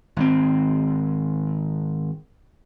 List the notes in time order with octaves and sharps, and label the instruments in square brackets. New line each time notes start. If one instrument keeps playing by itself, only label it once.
[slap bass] G#1 C4